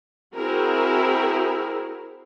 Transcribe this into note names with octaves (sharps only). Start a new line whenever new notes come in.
C4 E4 F#4 G#4 A#4